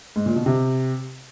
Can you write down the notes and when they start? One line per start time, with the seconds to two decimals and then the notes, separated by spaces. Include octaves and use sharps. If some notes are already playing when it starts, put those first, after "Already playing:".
0.16 G#2
0.26 A#2
0.36 B2
0.46 C3